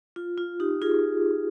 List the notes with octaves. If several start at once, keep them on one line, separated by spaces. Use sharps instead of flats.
F4
F4
D#4 G4
F4 G#4